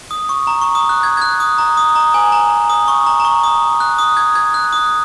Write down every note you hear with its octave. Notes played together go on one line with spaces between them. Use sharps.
D#6
C#6
A#5
C#6
D#6
F#6
G#6
G#6
F#6
D#6
A#5
D#6
A#5
G#5
A#5
D#6
C#6
A#5
A#5
C#6
D#6
F#6
D#6
G#6
G#6
F#6
D#6